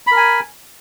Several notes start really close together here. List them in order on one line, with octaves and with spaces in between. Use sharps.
B5 A#4 G#5